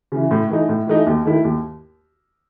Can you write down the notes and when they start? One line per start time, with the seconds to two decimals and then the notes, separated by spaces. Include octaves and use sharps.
0.12 C#3 E3
0.31 A2
0.50 E3 A3 D#4
0.69 A2
0.87 E3 A3 D#4
1.07 D#2
1.26 D#3 A3 E4
1.44 D#2